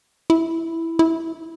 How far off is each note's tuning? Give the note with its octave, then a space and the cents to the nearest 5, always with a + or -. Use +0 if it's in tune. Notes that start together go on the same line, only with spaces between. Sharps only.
E4 +0
E4 -5